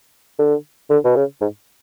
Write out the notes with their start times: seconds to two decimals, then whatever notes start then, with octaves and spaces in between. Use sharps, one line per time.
0.39 D3
0.90 D3
1.05 B2
1.16 C#3
1.41 G#2